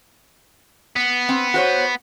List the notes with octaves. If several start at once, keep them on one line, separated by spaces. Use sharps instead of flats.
B3
C4
F#4 C5 C#5